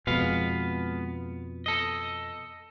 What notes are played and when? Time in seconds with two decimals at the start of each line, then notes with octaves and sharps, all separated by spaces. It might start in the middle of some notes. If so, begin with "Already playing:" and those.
0.07 F2 B2 G#3 B3 F5
1.66 A4 D#5